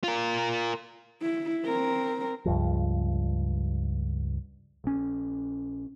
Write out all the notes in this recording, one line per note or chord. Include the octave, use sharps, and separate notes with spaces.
F4 A#4
E4
C4 A#4
C#2 G2 F3
A#1 C#4